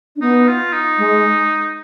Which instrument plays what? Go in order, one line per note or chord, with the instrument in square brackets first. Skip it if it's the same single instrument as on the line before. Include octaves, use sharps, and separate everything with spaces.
[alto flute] D4
[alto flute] B3 [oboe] D#4
[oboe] F4
D#4
[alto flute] G#3